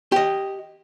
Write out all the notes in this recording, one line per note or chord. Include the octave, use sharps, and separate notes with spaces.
G4 D#5